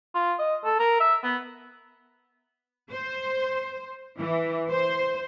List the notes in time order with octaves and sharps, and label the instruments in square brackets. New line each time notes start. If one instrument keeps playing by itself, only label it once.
[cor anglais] F4
D#5
A4
A#4
E5
B3
[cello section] C5
E3
C5